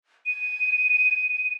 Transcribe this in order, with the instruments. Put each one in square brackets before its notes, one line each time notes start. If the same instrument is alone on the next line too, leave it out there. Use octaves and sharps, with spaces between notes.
[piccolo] D#7